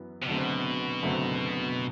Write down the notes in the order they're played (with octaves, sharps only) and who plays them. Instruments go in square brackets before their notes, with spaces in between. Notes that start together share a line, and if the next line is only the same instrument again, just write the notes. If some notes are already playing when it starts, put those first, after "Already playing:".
Already playing: [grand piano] F#2 E3 B3
[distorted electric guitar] C3
[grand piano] F#1 F#2 D3 A3 C4 [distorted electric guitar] B2
[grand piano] F#1 F#2 D3 A3 C4